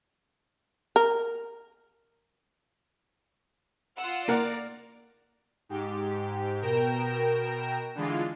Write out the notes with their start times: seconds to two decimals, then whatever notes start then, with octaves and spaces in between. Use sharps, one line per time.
0.96 A#4
3.96 F4 F#5 E6
4.28 A#3 A#4 D5 F#5 A#5
5.69 G#2 G4
6.61 B2 A#4 G5 A#6 E7
7.95 D3 E3 G#3 F4